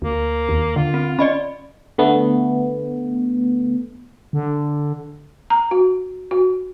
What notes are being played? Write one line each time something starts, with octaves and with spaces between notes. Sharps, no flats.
D2 A#3
D#2
D3 F4
C4
C#4 D5 D#5 B5
D3 A3 B3
D3
A#5
F#4
F#4